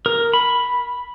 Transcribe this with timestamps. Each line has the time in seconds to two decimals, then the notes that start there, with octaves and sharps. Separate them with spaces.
0.06 A#4
0.33 B5